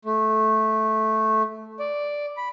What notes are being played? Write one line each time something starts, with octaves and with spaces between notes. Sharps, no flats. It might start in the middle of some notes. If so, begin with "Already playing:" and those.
A3
D5
B5